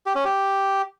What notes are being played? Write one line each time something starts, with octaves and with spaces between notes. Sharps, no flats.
G4
C#4
G4